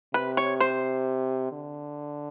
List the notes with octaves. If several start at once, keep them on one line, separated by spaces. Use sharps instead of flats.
C3 B4
C#5
C5
D3